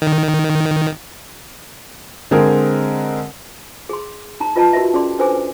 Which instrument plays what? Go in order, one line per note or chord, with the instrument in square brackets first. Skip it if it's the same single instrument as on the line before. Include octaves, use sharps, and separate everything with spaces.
[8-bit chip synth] D#3
[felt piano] D3 G#3 C4 G#4 A#4
[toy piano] G#4 C6
D#4 A#5
F4 B4 D#5 A5 A#5
D#4 F#4 A#4 B4 D#5 E5
C#4 G#4 D5 C6
D4 A4 B4 C5 G#5 D6